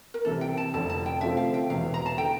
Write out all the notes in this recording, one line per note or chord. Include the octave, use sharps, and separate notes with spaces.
A#4
C2 C3 E3 A4
G5
A5
F1 F2 D3 A5
A5
G5
D3 F3 A3 C4 F4 E5
F5
G5
E1 E2 E3 F5
A#5
A5
D3 G5